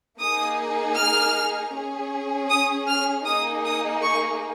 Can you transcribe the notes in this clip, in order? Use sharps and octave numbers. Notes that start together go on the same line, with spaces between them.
A#3 D#4 G#4 D#6
F6
C#4 G#4
D#6
F6
A#3 D#4 G#4 D#6
D#6
C#6